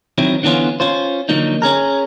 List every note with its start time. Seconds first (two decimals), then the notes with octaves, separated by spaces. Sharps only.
0.18 D#3 F#3 C4 E4
0.43 D3 E3 B3 C#4 F4
0.80 C#4 F4 C5
1.29 D3 F3 F#3 A#3 D#4
1.62 C#4 G#4 A#4